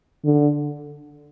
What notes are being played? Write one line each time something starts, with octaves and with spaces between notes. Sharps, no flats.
D3